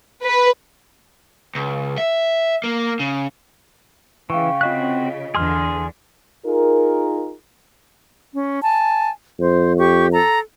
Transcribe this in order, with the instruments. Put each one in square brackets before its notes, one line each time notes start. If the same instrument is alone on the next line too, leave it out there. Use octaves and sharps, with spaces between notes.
[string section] B4
[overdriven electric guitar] C#2
E5
A#3
C#3
[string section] C#3 [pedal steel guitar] E3 [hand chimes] F5 G5 C#6
[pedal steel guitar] C4 F#4 F#6 [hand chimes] F4 D#5 B6
[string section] E2 D3 E3 [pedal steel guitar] G#4 C6 F6
[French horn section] D#4 F4 G#4 A#4
[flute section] C#4
G#5 A5
[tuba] F2 [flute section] C5
[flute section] G4 C#6
A4 A#5